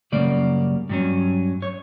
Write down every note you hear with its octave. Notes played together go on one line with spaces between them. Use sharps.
F#2 C#3 G3 A#3 D5
G2 F#3 C#4
C#5